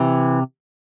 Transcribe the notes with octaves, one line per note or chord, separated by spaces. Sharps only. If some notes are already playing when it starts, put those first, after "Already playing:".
Already playing: C3 E3